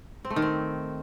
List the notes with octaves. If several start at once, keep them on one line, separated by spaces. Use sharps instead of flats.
C4
A3
D#3
C4